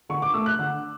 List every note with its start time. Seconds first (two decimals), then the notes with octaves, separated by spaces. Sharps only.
0.09 D3 C#6
0.22 D6
0.34 A3 E6
0.46 F#6
0.59 D3